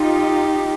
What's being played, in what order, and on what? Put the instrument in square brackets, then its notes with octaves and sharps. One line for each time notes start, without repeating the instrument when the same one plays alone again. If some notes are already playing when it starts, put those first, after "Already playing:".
Already playing: [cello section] D#4 F4 [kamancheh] G4